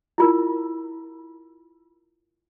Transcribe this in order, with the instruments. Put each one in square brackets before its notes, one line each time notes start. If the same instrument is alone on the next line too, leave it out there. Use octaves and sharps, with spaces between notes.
[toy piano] E4 F4 A#4